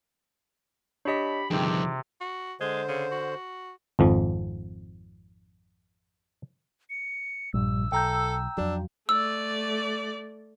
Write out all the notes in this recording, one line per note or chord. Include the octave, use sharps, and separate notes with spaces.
D4 G4 C#5 D#5 B5 B6
G1 F2 C3 D#3 G#4 G5 D6
F#4
D3 G#3 C5
C#3
F#4
G#1 F2 F3
C#7
A#1 G2 A#2 G3 E6
B1 A4 G5 A#5 G6
F2 F#3 D4
A3 D5 E6